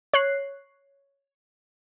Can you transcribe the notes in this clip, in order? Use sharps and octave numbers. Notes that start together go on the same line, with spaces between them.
C#5 F#6 C7